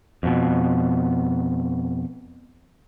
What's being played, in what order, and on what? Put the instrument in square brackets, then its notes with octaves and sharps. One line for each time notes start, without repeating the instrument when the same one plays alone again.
[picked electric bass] F2 B2